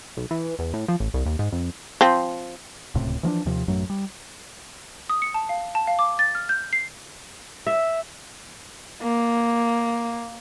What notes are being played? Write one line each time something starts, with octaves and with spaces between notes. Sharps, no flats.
B1
E3
E2
A2
F3
A1
C2
D#2
G#2
F2
F3 C4
D1 C#2 A2 C3
E3 F3 A#3 D4
D#2 C3 F3
A1 F#2 F#3 A3
G3
D#6
C#7
A5
F5
A5
F5
D6
A6
F6
G6
C7
E5
A#3